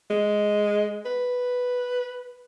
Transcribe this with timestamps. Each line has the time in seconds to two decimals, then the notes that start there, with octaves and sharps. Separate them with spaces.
0.10 G#3
1.06 B4